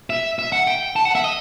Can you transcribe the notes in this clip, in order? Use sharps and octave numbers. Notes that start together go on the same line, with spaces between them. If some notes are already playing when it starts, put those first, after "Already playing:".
E5
E5
F#5
G5
A5
F#5
E5
D#5